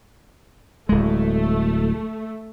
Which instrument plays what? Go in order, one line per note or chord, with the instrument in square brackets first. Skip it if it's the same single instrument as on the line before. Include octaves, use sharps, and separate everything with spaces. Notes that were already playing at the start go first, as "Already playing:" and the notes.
[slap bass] D1 G#3 [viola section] A3